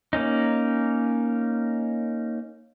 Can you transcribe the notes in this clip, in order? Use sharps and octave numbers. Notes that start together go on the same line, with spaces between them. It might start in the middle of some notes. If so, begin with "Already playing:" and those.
A#3 C#4 D#4